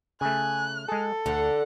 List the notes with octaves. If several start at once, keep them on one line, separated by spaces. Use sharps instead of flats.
C#3 A3 G#5 F#6
G#3 G#4 A4
D2 D3 F#5